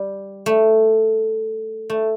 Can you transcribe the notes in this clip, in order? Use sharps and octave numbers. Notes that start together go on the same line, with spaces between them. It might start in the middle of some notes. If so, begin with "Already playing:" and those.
Already playing: G3
A3
A3